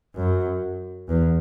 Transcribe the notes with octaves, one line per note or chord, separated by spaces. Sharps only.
F#2
E2